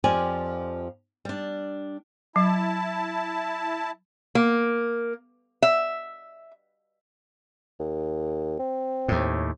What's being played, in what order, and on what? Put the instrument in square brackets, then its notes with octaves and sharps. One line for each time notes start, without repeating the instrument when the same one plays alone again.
[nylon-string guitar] F2 F3 G4 D5 G#5
G3 D4
[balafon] F#3 [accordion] E4 A5
[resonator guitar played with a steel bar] A#3
E5
[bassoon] D#2
C4
[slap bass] D#2 A2